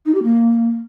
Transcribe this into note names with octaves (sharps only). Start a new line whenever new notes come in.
D#4
G4
A#3